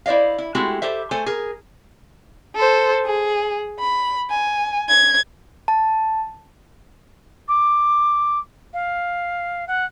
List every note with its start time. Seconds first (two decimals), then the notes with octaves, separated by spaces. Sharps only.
0.06 E4 C5 D5 D#5 F5
0.38 E4
0.55 G#3 A3 C4 E4 F#4 G4
0.82 G4 A4 C5 E5
1.11 A3 A4 C5 G#5
1.26 G#4 A#4
2.55 A4 C5
3.06 G#4
3.80 B5
4.30 G#5
4.89 G#6
5.68 A5
7.48 D6
8.73 F5
9.67 F#5